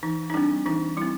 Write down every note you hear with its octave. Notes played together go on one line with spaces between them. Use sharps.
E3 D#4
D#4
G3 C4 D4
E3 D#4
G3 C4 E4